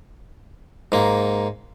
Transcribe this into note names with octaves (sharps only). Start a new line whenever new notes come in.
G#2 A#3